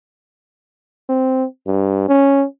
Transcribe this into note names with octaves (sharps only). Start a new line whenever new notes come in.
C4
G2
C#4